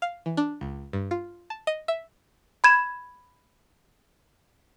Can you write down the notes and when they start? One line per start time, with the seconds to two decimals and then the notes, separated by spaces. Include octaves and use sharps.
0.02 F5
0.26 E3
0.37 D4
0.61 C#2
0.93 G2
1.11 F4
1.50 A5
1.67 D#5
1.88 E5
2.64 B5 G#6 E7